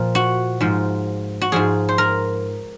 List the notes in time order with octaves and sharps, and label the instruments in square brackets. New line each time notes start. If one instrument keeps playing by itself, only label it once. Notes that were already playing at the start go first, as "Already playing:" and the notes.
Already playing: [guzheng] A#2 F3
F#4
G#2 F3
F#4
G#2 F3 G#4
C5
A#4